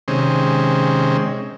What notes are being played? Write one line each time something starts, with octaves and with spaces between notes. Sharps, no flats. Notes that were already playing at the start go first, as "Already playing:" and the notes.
C3 D#3 G#3 C4 C#4